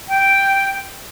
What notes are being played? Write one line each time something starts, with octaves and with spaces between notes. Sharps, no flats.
G5